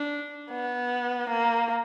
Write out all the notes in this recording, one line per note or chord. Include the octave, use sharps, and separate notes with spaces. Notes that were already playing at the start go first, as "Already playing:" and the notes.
Already playing: D4
B3
A#3